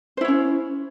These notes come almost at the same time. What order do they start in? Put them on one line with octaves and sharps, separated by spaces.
C5 E4 C#5 C#4